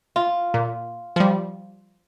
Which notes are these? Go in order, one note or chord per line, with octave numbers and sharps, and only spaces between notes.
F4
A#2
F3 G3